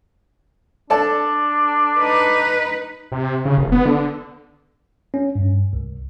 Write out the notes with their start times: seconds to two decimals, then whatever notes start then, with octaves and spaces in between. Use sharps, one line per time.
0.90 D4 A4 D5 A5
1.99 D#4 B4
3.12 C3
3.45 C#3
3.58 F1
3.72 B3
3.85 D3
5.14 C#4
5.35 G2
5.73 C2